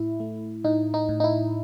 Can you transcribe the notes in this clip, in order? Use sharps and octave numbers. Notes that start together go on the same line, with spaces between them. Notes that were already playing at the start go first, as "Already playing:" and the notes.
Already playing: A2 E4
A3
A2 D#4
D#4
A2
D#4
E4